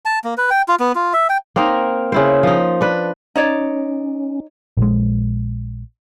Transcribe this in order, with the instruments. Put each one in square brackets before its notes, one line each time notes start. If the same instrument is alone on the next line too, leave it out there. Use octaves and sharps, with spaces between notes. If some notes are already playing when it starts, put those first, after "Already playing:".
[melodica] A5
A#3
B4
G5
F4
B3
F4
E5
G5
[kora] A#3 C4 D#4 A#4
C#3 E4 C5
F3 D#4
D4 B4
[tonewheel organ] C#4 [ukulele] D#4 C#5 D5
[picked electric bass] A#1 G#3